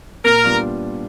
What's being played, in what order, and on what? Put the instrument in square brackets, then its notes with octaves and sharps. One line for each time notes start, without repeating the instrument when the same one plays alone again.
[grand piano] A#2 [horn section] A#4
[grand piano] G3 B3 D4 F4